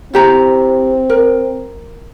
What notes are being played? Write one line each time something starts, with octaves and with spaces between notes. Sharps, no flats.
C4 E4 G4 A#5
A#4